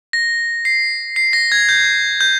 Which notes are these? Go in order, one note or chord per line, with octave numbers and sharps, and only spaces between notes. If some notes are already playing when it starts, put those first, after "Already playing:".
A#6
C7
C7
A#6
G#6
G6
G6